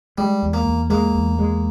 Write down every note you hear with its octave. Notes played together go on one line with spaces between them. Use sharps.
G3 G#3
E2
A#3
E2
G#3 A#3
E2
G#3